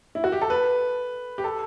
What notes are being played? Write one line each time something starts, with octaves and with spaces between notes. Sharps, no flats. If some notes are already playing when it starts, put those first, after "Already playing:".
E4
F#4
G4
A4
B4
G4
A4